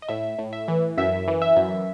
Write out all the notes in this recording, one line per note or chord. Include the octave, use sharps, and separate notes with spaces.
D#5
A2 E5
A2
E5
E3
F#2 E5
E3
E5
F#2